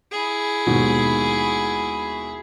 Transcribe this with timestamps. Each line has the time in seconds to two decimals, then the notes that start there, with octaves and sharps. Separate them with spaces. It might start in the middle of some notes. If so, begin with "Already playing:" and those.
0.12 E4 G#4
0.67 D#2 G#2 B2